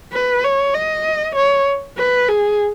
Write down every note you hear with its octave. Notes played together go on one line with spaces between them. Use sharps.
B4
C#5
D#5
C#5
B4
G#4